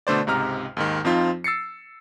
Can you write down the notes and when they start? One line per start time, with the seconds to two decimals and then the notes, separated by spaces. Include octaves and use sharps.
0.07 B2 D3 A3 C5 D5
0.27 C#2 G#2 C3 A#5 F6
0.77 D#2 G#2 D#3
1.05 F2 F3 C4 D#4 F4
1.44 E6 A6 C7 C#7